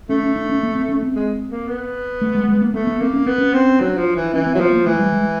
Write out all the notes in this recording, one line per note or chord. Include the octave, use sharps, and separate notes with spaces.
A3 C#4
C#4
D4
C#4
A#3
C4
C#4
C4
G#3
A#3
B3
A3
G#3
G#3
A#3
A3 B3
B3
A#3 C4
C#4
B3 C4
C#4
C4
F#3 D4
F3
E3
E3 C#4
C4
F#3
F3 B3
A#3
E3 A3
G3
G#3